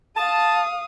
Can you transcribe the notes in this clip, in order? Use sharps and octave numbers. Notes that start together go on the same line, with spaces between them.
F5 A5 D#6